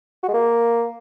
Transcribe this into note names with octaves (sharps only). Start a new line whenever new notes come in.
F#4
G#3
A#3